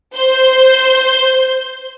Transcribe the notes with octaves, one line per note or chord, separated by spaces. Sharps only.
C5 G6